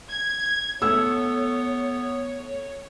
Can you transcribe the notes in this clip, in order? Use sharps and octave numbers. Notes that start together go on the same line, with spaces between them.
G#6
A3 B3 C#5 E6